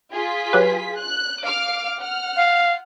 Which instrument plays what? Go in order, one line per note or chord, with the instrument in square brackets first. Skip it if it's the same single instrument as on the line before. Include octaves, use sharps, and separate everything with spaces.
[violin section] F4 G#4 B6
[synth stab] F#3 G4 B4
[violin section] F#6
F5 D6 F6
F#5 F6
[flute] F5